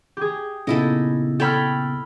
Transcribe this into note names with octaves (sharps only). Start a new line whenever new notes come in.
G4 G#4
A#2 C#3 B3 D#4 E4 A4
A4 C#5 D5 G5 B5 F6